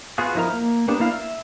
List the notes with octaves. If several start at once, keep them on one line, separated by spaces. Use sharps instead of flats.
B3 F4 F#4 G#4
F3 D#4 E4 A#4 A#5
A#3
A#3 B3 D4 G4
A#3 E4 D5 F5
E5